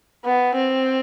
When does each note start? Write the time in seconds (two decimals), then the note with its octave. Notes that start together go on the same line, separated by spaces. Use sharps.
0.25 B3
0.55 C4